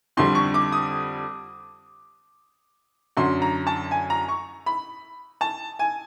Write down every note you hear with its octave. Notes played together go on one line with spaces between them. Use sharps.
F2 D3 G3 C6
C#6
D6
D#6
F#2 D3 F#3 C6
A#5
A5
G#5
A#5
C#6
B5
A5
G#5